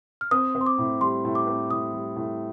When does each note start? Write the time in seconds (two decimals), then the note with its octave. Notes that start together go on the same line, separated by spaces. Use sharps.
0.21 F6
0.31 C4 D#6
0.55 C4
0.61 C6
0.66 D6
0.78 A2
1.01 G3 C6
1.25 A2
1.35 D6
1.47 C4
1.70 A2 D#6
1.93 G3
2.16 A2